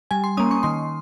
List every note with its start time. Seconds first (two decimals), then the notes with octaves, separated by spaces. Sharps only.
0.11 G3 G#5
0.24 C6
0.37 A#3 C#4 D#6
0.51 C#6
0.63 D#3 C6